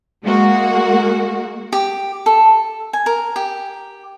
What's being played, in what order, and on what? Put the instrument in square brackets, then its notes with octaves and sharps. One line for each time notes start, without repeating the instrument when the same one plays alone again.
[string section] G#3 A#3 F#4
[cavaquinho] G4
A4
G#5
A#4
G4